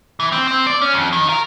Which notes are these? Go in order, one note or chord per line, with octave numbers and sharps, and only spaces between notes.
E3
C4
C4
D5
C#4
F2
D#3
A#4